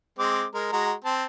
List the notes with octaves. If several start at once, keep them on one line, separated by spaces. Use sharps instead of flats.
G#3 C4 D6
G#3 A#4
G#3 F#4 A#5
C4 A5